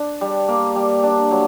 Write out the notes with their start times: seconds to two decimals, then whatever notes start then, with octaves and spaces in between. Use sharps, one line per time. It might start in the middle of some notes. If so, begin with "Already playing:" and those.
Already playing: D4
0.21 G3
0.48 A#3
0.76 G3
1.03 D4
1.31 F#3